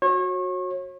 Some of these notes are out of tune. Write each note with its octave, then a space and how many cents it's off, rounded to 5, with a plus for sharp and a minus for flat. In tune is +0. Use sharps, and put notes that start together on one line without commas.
F#4 -15 C#5 -35